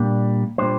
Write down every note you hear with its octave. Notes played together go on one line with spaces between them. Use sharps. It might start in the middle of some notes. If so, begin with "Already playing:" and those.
Already playing: A#2 G3 A#3 D4
A#2 G3 D4 C5